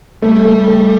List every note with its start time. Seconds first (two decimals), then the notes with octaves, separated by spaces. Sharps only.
0.22 G3 A3
0.45 A3
0.68 A3